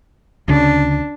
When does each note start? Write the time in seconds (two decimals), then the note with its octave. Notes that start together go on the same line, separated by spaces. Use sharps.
0.48 D2 C#3 D4